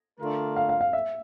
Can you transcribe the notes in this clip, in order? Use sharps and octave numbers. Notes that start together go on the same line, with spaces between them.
D3 A3 D4 F4 A#4
F5
F5
F5
E5